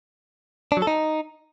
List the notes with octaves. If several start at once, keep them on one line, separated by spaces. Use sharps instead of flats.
D4
F#3
A4
D#4